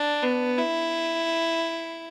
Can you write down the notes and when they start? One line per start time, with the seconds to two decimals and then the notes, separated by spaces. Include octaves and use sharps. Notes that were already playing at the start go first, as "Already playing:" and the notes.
Already playing: D4
0.22 B3
0.58 E4